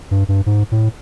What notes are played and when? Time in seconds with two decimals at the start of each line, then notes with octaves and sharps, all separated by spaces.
0.11 G2
0.29 G2
0.46 G#2
0.72 A2